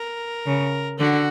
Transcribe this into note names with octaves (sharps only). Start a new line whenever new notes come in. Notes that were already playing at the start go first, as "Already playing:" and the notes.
Already playing: A#4
C#3
D3 F#4